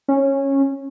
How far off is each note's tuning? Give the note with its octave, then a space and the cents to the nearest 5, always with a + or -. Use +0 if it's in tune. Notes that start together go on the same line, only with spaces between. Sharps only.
C#4 -15